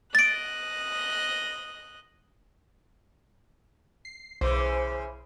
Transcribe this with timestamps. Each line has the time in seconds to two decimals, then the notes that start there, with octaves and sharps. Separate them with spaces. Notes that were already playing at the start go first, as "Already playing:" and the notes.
0.15 D#5 F#6 A6 D7
4.05 C7
4.41 B1 C#3 E3 C5